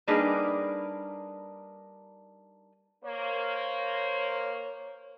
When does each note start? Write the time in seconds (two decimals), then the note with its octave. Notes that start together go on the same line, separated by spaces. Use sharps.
0.07 G3 A#3 D4 D#4 G#4 B4
3.05 A#3 C5 C#5